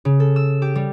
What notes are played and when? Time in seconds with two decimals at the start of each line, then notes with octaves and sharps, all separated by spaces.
0.05 C#3
0.20 A4
0.36 E6
0.62 G4
0.75 G3